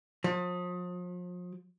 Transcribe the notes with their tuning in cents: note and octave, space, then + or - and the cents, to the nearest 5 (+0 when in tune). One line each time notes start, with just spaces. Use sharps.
F3 +40